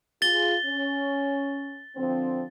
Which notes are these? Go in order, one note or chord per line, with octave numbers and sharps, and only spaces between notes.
F4 G#4 A6 G7
C#4
D3 F3 C4